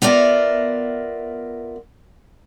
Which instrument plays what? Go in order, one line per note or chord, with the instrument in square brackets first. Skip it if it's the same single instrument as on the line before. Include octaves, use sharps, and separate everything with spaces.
[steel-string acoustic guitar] B3 F4 A#4 D5 E5